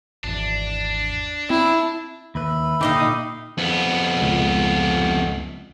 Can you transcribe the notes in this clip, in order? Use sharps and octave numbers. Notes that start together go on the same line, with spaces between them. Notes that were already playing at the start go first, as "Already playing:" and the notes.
G#1 E2 D4
C4 E4
D#2 B4 E5 B5
A#2 D3 D#4 G4 D#5 F5
F2 B3
C#2